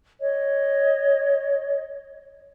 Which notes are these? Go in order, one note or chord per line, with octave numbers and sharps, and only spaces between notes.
C#5 D#5